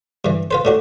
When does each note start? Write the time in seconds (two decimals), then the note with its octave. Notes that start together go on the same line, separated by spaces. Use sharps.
0.25 G2 E3
0.51 F4 B4 C5
0.65 A2 D4 F#4